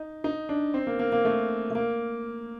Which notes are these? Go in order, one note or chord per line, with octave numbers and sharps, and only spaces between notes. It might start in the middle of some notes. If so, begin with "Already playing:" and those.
Already playing: D#4
D#4
D4
C4
A#3
A#3
A#3
A3
A3
A#3